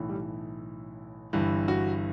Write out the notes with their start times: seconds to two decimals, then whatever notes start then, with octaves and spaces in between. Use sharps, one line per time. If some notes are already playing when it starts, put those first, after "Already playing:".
Already playing: B1 A2 E3
0.09 G3
1.33 G1 G2 E3
1.68 F#4